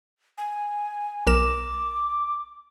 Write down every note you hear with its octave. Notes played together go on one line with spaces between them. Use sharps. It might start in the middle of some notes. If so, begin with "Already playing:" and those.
G#5
B1 A#4 D6 E7